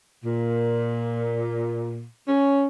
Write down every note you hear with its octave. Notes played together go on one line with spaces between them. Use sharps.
A#2
C#4